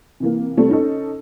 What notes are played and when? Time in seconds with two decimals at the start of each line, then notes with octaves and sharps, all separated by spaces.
0.20 C3 E3 A#3
0.57 C3 G3 A3 C4
0.69 C#4 D#4 A4